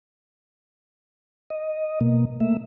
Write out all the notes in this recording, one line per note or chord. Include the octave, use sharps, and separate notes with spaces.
D#5
B2 A#3
A3 A#3 E5